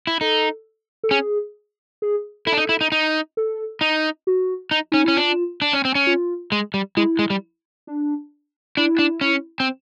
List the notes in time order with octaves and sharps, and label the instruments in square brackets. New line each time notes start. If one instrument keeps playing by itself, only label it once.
[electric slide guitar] E4
[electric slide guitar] D#4 [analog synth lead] A4
[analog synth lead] A4
[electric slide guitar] C#4 [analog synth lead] G#4
[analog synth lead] G#4
[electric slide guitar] E4 [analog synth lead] A4
[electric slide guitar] D4
D#4
E4
D#4
D#4
[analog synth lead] A4
[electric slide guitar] D#4
[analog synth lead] F#4
[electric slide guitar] D#4
[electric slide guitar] C#4 [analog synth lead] D#4
[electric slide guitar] C#4 [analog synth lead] E4
[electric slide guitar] D4 [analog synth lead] F4
[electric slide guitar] D4
C#4
C4
C#4
[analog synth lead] F4
[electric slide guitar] G#3
G3
[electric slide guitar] G#3 [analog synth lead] E4
[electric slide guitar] G#3
G3
[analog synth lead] D4
[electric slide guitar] D4 [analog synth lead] E4
[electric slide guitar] D4
C#4
C4